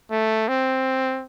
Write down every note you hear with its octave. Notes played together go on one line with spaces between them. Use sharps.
A3
C4